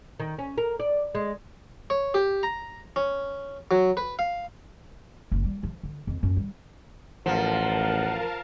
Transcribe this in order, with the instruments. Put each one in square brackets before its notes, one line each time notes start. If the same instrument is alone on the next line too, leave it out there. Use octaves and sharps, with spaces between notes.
[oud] D#3
C#4
A#4
D5
G#3
[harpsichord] C#5
G4
A#5
C#4
F#3
B4
F5
[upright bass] F#1
G3
F3
D3
F2
F#2
G3
[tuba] A1 [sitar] F3 [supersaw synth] A#4 F5 A5 [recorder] F#5